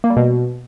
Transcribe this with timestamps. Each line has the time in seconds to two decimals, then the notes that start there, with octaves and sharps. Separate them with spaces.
0.04 A#3
0.10 G3
0.17 B2